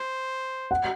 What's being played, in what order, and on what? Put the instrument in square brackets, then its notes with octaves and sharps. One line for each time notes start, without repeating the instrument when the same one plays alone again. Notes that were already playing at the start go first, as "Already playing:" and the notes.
Already playing: [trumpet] C5
[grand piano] F#5